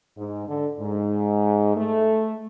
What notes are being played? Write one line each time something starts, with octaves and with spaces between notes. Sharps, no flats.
G#2
D3
G#2
A3